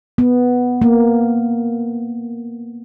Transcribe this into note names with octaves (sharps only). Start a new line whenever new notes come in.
B3
A#3